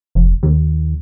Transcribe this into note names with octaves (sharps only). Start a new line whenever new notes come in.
F1
D#2